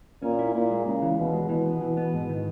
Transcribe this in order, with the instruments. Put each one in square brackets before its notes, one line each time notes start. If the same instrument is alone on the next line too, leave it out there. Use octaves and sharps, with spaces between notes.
[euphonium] A#2 [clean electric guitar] C#4
[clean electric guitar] E4
[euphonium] A#2 [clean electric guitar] E4
[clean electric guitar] G#3
[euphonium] C#3 [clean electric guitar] G#3
[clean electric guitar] E3
[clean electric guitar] D#2 [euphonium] B2
[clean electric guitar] G#3
[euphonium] B2 [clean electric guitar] E3
[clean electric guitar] B3
E3
B3
G#2
D#3